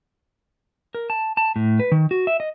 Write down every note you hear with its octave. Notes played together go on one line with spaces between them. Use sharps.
A#4
A5
A5
A2
B4
D#3
F#4
E5
D#5